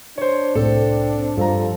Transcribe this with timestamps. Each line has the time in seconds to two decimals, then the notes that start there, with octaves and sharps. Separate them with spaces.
0.18 D4 C5 C#5
0.55 C2 A2 C4 A4
1.37 G2 F3 A4 A#5